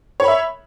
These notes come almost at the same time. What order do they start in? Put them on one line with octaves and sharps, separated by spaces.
C#5 B5 E5